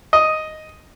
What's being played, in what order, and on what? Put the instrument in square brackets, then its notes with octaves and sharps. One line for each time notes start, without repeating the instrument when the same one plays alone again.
[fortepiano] D#5